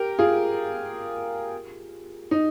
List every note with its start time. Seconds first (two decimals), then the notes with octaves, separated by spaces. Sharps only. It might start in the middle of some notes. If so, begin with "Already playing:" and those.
Already playing: G4 A#4
0.19 F4 G#4
2.31 D#4